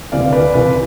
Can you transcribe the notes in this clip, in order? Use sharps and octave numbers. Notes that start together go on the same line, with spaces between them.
D2 C3 E3 D5 F5
B4 D5
C2 C3 E3 B4